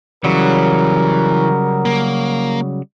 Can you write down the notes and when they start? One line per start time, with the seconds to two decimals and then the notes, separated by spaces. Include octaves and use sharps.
0.24 C#3 E3 F#3 G3 A#4
1.85 A#3